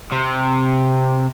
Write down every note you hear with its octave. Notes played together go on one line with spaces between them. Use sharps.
C3